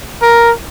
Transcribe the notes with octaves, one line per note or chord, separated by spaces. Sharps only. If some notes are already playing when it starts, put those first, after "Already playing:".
A#4